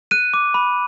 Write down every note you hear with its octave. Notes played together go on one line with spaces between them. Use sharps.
F#6 D#7
D6
B5